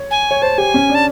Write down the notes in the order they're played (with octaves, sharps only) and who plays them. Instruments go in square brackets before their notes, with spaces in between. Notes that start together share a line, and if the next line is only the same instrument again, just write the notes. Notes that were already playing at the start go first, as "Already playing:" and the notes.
Already playing: [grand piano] C#5
[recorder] G#5
[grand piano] C#5
[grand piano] C5 [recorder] A5
[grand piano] G4 [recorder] G#5
[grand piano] C#4
D4
[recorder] A5